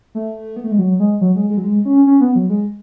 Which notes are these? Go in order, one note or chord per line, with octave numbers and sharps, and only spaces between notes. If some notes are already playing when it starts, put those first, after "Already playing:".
A3
B3
A3
G#3
F#3
G#3
F#3
G#3
G#3
F#3
G#3
C#4
C#4
B3
F#3
G#3